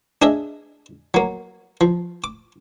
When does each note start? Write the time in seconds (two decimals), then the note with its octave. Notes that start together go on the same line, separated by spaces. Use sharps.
0.22 D4 G#4 D#5 E5
1.14 F#3 A#3
1.81 F3
2.24 D6